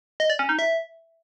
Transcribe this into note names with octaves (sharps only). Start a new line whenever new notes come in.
D#5
D5
C#4
D#4
E5